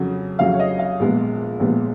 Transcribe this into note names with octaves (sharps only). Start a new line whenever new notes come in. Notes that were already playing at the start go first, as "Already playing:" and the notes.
Already playing: F2 C#3 F#3
F2 C#3 F#3 F5
C#5
D#5
F5
A#1 A#2 G#3 B3
A#1 A#2 G#3 B3